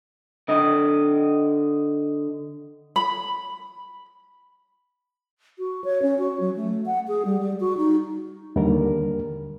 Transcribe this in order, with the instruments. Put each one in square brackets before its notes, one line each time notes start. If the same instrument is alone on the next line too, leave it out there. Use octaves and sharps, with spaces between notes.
[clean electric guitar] D3 D#5
[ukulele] B5
[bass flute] F#4
C#5
C#4
F#4
F#3
A3
F#5
G#4
G3
G3
F#4
D#4
[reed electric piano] D#2 D3 G3 A#4